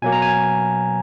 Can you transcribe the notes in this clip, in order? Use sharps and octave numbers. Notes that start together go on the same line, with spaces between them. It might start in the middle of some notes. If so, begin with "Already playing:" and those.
B2 F#3 A#3 G#5
A#5
G#5